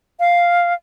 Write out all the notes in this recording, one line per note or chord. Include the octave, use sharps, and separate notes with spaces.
F5